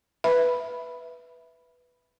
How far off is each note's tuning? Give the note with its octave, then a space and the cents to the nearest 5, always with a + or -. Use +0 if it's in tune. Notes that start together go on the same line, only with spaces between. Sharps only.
B4 +0 E5 +0 B5 +0